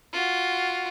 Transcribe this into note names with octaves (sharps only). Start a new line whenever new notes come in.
F4 F#4